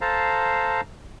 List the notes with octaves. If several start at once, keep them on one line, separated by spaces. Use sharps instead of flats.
A4 C5 F5 A5 A#5